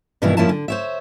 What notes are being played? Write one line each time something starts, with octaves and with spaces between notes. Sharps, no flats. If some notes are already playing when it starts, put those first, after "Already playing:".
G2 B2 D#3 E3 A#3 E4
F#2 F3 A#3 C#4 E4 A5
D3
C5 C#5 E5